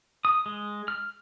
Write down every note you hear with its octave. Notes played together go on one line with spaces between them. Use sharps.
D#6
G#3
F6